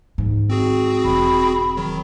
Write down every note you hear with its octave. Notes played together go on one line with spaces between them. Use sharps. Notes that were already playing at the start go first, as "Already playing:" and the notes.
G#2 D#3
C4 F#4 G#4
E1 B5
D#3 F#3